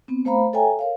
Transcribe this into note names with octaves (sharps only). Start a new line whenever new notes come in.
B3 C4
A3 C5 F5 A#5 B5
A4 C#5 E5 G5 G#5 A#5
A#4 C#5 F5